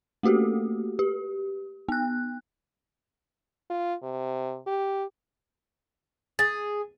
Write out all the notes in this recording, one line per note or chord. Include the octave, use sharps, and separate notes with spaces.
A3 A#3 F#4 G4 A4
G4
B3 F#6
F4
C3
G4
G#4 A6